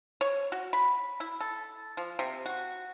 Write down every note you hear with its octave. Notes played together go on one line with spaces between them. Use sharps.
C#5
F#4
B5
E4
A4
F3
C3
F#4